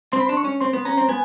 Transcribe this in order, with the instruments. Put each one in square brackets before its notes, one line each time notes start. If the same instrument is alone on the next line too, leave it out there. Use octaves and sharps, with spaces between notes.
[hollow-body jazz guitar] C4 [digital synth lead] C6
[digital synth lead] B5
[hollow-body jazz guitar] D4 [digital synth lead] C6
[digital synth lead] C#6
[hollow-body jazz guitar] C#4
[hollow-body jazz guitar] C4 [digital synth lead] C6
[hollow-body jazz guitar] B3
[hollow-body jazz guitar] C#4 [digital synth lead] A#5
[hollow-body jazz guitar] C4
[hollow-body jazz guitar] B3 [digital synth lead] G#5